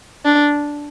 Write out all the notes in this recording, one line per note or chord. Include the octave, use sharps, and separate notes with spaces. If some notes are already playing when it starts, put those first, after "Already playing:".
D4